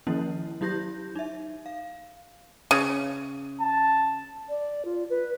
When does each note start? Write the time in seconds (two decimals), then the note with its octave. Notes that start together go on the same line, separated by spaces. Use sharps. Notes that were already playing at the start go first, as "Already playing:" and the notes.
0.07 D#3 F3 A#3 C#4 E4
0.61 F#3 E4 G4 G6 A#6
1.15 D#4 E5
1.66 F5
2.71 C#3
3.61 A5
4.49 D5
4.85 F4
5.10 B4